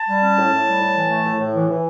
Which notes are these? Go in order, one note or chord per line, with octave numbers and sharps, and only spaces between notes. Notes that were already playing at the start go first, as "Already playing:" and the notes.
Already playing: A5
G3
C#4
A2
A2
G3
A2
E3
A3
A2
A2
E3
E3